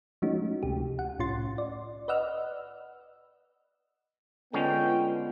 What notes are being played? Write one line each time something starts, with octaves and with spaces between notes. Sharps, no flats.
F3 G#3 A3 C#4 D#4 F#4
C#2 C3 G4
F#5
C2 A2 C#4 F4 C6 A6
D5
B4 D5 D#5 F#5 E6 F6
D3 G#3 B3 C#4 F4 G5